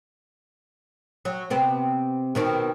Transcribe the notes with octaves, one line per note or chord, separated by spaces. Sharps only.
F#3
C3 B3 C4
B2 D#3 C4